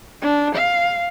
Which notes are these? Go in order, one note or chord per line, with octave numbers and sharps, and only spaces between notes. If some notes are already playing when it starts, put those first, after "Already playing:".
D4
F5